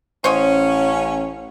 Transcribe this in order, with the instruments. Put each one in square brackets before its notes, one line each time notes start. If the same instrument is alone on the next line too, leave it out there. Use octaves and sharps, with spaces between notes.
[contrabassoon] A1 [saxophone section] C#4 [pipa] C5 C#5 D#5